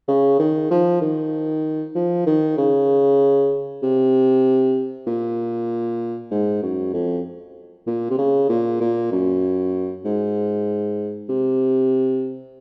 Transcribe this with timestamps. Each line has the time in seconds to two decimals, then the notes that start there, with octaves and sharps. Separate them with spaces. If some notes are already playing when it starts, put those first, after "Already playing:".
0.08 C#3
0.39 D#3
0.70 F3
1.01 D#3
1.95 F3
2.26 D#3
2.57 C#3
3.82 C3
5.07 A#2
6.31 G#2
6.62 F#2
6.93 F2
7.86 A#2
8.10 C3
8.18 C#3
8.49 A#2
8.80 A#2
9.11 F#2
10.04 G#2
11.29 C3